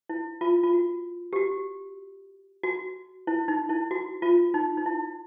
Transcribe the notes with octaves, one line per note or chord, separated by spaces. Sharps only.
E4
F4
F4
F#4
G4
F#4
F#4
E4
D#4
E4
F#4
F4
D#4
D#4
E4